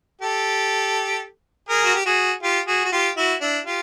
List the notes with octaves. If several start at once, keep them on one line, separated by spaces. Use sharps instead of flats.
G4 A4
G#4 A#4
F#4
G4
F#4 G#4
F4 G4
F#4 G#4
F#4
F4 G4
E4 F#4
D4 E4
F4 G4